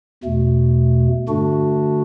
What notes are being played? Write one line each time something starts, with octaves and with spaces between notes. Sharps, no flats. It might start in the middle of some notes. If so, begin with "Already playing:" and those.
E2 B2 A3
G2 D3 A3 D4 F#4